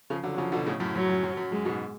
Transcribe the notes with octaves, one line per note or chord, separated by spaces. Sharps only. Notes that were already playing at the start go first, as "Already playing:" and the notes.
C#3 F3
D3 F#3
F#3
C#3 F3
B2 D3
A2 C#3
F#2 A2
F#2 F#3
F#2
F#2
F#2
F#2 G#3
G#2 B2